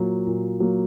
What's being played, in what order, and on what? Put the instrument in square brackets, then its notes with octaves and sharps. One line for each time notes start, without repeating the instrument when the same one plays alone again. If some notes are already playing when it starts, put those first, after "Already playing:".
Already playing: [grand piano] A#2 F#3 A#3
A#2
F#3 A#3